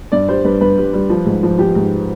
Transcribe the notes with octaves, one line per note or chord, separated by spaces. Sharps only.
G2 D5
G3 C5
G2 B4
G2 B4
G3
G3
F3
G#2
F3
F3 G4
G#2